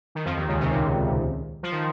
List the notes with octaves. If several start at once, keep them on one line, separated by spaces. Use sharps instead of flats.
D#3
F2 F3
D#2 D#3
C#2 C#3
C3
A#2
F3
D#3